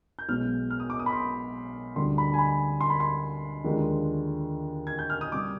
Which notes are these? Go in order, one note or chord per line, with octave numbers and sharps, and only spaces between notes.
G6
B1 B2 G#3 F6
F6
D#6
D6
D#6
B5
C6
D2 D3 G3 C6
B5
G#5
B5
C6
B5
C6
D#2 D3 F3 G#3
G#6
G6
F6
D#6
C3 G3 D6